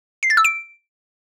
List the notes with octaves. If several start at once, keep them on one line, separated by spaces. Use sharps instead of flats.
C7
A6
E6
D7